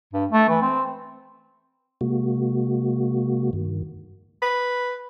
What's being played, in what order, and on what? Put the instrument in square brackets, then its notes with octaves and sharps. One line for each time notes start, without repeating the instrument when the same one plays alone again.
[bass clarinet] G2
A3
E3
C4
[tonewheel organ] C3 G#3 A#3 F#4
G2 D#3
[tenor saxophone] B4